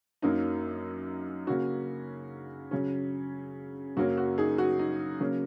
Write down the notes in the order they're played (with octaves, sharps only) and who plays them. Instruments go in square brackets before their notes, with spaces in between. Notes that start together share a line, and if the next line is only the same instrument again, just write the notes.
[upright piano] F#2 F#3 A#3 C#4 D#4
C#3 A#3 C#4 F#4
C#3 F#3 C#4
F#2 C#3 F#3 A#3 C#4 F#4
F#4
D#4 G#4
F#4
D#4
C#3 F#3 A#3 C#4